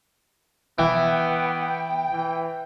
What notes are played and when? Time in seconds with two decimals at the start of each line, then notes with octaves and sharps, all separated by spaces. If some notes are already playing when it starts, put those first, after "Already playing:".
0.79 E3 B3 G5
2.13 E3